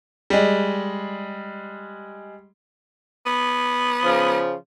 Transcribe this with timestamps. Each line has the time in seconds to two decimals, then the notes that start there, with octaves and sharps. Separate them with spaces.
0.30 G3 G#3
3.26 B3
4.04 C#3 F3